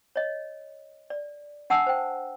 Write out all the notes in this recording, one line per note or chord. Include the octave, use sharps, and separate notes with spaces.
C#5 D#5
D5
D4 F#5 A5 E6
C5 G5